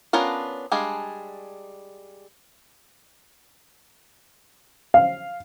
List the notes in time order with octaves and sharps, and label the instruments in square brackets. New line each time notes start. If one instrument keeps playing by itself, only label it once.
[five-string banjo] B3 C#4 D4 F4 A#4
G3 G#3 D4 G#4 F5
[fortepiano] F5